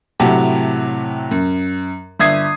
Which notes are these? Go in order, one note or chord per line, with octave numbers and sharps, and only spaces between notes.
A2 C3 F#3 G4 F#5 A5
F#2
G1 E5 D#6 G#6 C7